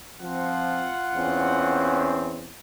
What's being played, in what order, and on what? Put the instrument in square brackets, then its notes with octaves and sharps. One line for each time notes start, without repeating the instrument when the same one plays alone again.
[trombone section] F3 C4 [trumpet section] F4 F#5
[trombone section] E2 C4 C#4